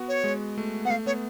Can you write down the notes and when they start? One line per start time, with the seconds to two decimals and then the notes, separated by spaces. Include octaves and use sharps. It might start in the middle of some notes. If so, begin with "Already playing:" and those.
Already playing: B3 F#4
0.08 C#5
0.24 G#3
0.58 A3
0.85 B3 F#5
0.90 A3 F5
1.06 B3 C#5